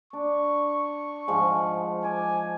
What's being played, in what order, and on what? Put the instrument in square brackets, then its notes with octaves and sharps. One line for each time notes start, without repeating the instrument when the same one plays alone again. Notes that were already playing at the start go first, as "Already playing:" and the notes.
[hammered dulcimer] D4 [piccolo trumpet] C#6
[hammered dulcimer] G#2 F3
[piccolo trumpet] G#5 [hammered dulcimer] D6